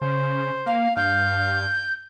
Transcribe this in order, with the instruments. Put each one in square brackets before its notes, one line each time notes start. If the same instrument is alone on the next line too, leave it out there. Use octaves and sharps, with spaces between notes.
[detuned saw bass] C#3 [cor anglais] C5
[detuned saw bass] A#3 [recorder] F5
[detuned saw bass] G2 [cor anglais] F5 [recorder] G6